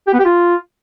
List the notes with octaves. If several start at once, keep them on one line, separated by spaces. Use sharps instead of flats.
G4
B3
G4
F4